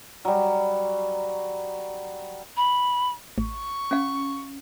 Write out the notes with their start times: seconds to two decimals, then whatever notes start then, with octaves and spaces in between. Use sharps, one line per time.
0.25 F#3 G3
2.57 B5
3.38 A1 C#6
3.91 C#4 F5